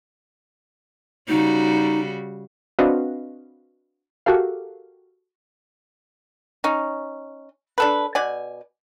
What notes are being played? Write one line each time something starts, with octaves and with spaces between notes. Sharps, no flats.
C#3 G3 D#4 F#4
C4 D4 F#4 B4 D#5 F5
F#4 G4 A4 A#4 F5
C#4 D#4
D4 A4 B4
B2 D5 G#5